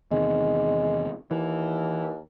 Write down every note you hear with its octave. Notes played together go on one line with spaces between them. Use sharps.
E2 C3 D#3 G#3
D#2 E3